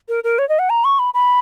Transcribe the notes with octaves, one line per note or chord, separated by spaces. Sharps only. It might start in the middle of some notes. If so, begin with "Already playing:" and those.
A#4
A#4
C#5
D#5
F#5
A#5
C#6
B5
B5